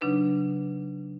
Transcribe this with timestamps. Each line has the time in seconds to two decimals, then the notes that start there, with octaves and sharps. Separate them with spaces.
0.01 C#3 F#3 D4 D#4 B4